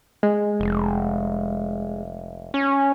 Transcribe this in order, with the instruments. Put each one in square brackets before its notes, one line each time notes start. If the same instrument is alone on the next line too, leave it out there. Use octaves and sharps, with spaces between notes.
[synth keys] G#3
[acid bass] F1
C#4